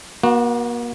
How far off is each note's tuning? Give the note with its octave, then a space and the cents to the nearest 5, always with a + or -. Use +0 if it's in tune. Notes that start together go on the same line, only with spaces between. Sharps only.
A#3 +40 F#4 -10